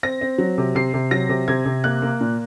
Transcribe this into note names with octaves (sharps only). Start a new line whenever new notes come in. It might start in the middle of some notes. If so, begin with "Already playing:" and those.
C4 A#6
C4
F#3
C3
C3 C7
C3
F#3 A#6
C3
C3 G#6
C3
A#3 F#6
A#3
A#2